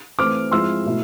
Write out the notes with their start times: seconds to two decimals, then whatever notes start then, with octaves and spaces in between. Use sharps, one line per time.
0.19 E3 A3 C4 D6 F6
0.51 F3 G#3 C4 E4 C6 E6
0.86 B2 A3 E4